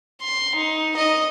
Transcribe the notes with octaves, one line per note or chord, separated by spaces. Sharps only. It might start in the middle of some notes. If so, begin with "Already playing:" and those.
C6
D#4
D#5